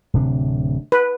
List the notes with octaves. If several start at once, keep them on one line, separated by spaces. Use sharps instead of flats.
D1 C3 D4
B4